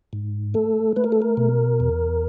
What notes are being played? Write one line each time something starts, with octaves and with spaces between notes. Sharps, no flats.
G#2
A3 A4
A3 B4
A#4
A4
A#4
B2
E2